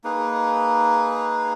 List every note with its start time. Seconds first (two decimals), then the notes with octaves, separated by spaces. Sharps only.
0.04 A#3 D#4 G#4 B4